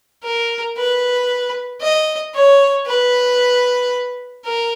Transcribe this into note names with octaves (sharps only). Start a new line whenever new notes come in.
A#4
B4
D#5
C#5
B4
A#4